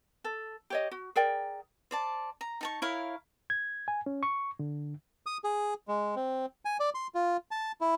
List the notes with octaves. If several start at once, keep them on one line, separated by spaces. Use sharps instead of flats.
A4
G4 C#5 D#5
F#4
G#4 A#4 D5 G5
C5 D5 A5
A#5
D#4 A5 C#6
E4 A#4 C#5 F5
G#6
G#5
C#4
C#6
D3
D#6
G#4
G#3
C4
G#5
D5
C6
F4
A5
E4